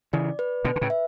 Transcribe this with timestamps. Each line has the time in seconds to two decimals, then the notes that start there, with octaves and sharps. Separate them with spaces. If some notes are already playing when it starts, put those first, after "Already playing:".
0.13 C#3 E3 D5
0.39 B4
0.65 B2 D3 B4
0.76 D3
0.81 A2 C#3
0.90 E5